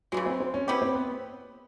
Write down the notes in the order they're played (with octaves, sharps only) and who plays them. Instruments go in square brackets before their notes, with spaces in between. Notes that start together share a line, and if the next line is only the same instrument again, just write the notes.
[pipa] C#3 E3 G#3 [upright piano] F#3
[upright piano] C4
C4
C#4
[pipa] B3 E4 G4 [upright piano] C4
[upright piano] C4
B3